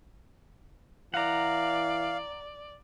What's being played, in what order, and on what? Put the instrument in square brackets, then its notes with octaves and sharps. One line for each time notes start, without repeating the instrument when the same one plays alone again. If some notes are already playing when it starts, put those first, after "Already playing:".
[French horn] E3 [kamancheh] D5 [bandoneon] F5 [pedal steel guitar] F#5 A#5